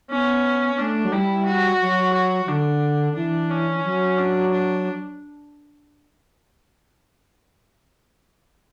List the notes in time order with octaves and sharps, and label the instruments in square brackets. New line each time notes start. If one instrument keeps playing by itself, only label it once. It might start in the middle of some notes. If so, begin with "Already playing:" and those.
[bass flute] B3 [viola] C#4
[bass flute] A3 [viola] D4
[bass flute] F#3
[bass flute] G3 [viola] E4
[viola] F#4
[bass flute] F#3
[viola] F#4
[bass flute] D3 [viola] D4
[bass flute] E3 [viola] D4
[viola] C#4
[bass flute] F#3
[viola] D4
D4